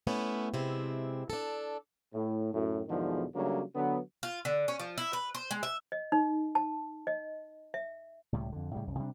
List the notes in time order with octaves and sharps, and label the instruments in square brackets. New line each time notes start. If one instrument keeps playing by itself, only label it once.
[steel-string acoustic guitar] A3 B3 C#4 E4
C3 G#3 C4 E4
D4 A4
[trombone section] A2
F#2 A2
E2 G#2 B2 D3 D#3 F3
C#3 F#3 G3 A3 A#3 D4
D3 F#3 B3
[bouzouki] F4
D3
C#4
F3
E4
B4
C5
G#3
E5
[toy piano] D#5
D#4
A5
D#5
E5
[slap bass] C#2 A2 C3 G3
F2 D3
A2 C#3 G3
C2 F#2
C3 G3 B3 D4